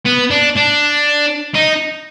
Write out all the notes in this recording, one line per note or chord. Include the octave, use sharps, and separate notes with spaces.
B3
D4
D4
D#4